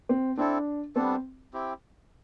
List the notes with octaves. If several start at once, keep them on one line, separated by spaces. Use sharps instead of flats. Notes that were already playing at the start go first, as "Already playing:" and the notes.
C4
C4 D4 E4 A4
G3 B3 C4 D4 A4
C4 E4 G4